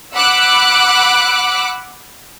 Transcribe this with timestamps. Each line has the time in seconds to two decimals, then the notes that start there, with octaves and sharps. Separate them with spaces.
0.14 F#5 B5 D6 E6 F#6